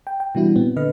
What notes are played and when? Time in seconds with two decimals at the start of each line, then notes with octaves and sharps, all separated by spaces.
0.07 G5
0.20 G5
0.35 B2 E3 G3 D4 E4 F#4
0.56 A#2 B3 C4
0.76 A#2 D3 B4 D#5 F6